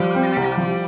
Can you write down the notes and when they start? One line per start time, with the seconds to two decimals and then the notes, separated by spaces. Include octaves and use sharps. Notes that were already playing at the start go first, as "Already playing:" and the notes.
Already playing: F3 G3
0.15 C4
0.36 C2
0.57 F3